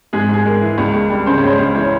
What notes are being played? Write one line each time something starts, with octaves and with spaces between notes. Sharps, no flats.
G#2 G#4
G#2 G#4
G#3 A#4
E3
C#2
C#2
G3
C#3 C5
C#5
C#2
C5
C#2
E3 C#5